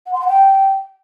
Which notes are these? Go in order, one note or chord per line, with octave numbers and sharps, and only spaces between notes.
F#5
C6
F#5
G5